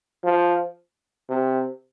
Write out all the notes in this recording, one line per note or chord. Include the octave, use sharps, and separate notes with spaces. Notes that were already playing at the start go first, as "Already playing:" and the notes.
F3
C3